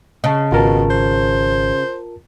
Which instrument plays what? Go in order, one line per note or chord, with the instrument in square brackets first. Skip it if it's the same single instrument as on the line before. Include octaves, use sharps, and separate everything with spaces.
[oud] C#3 [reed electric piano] D#5 A5
[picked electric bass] G#1 [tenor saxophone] B2 [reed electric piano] F4 A#4 A5
[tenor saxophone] C5